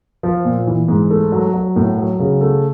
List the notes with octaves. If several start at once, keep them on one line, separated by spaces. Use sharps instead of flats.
F3
A#2
E3
G#2
A3
F#3
F#3
A2
F#3
C#3
A3